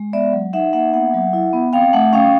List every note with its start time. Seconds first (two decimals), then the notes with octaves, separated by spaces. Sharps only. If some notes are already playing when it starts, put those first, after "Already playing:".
Already playing: G#3
0.13 B3 D5 E5
0.33 F#3
0.53 D#4 E5 F#5
0.73 A#3 E5 F#5
0.93 B3 E5 F#5
1.14 F#3
1.33 E4
1.53 B3
1.73 C4 F5 G5
1.93 A3 E5 F#5
2.13 C#4 F5 G5